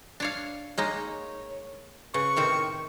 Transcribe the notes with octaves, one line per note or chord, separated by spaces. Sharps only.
D4 C#5 F5
G#3 A#3 D#4 C#5
C#3 B4 C#6
A2 C3 D#3 C4